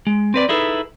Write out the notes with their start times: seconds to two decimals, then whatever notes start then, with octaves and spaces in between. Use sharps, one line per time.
0.07 G#3
0.34 C4 B4 D5
0.49 D#4 E4 G#4 A4 B4